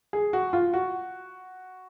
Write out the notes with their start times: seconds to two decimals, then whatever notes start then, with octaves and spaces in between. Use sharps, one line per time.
0.13 G#4
0.33 F#4
0.53 F4
0.74 F#4